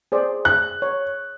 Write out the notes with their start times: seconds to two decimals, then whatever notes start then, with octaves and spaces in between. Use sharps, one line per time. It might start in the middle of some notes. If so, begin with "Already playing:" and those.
0.12 G#4 C5 D5
0.45 F#6
0.82 C#5